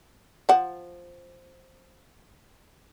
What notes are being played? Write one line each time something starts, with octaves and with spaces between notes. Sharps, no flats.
F3 F#5